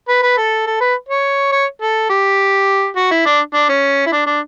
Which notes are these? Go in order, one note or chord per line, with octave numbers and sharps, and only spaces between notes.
B4
B4
A4
A4
B4
C#5
C#5
A4
G4
F#4
E4
D4
D4
C#4
E4
D4
D4